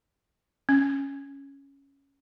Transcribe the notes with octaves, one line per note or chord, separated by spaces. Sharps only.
C#4